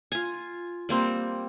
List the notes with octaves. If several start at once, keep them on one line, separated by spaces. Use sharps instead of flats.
F4 G#5
G3 A#3 C4